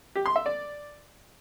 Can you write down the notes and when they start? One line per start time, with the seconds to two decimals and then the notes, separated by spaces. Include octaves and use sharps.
0.15 G4
0.26 C6
0.36 E5
0.46 D5